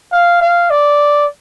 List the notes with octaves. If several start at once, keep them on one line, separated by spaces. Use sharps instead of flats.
F5
F5
D5